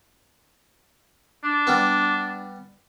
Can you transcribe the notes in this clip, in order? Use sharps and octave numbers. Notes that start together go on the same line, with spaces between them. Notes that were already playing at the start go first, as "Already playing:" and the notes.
D4
G3 B3